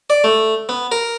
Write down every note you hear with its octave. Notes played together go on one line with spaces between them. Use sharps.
D5
A3
B3
A#4